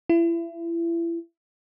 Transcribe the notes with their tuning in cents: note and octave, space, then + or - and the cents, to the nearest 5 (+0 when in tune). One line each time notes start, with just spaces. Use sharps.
E4 +30